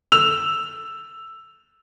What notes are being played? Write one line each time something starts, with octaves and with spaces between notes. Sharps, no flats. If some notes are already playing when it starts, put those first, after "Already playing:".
E6 F7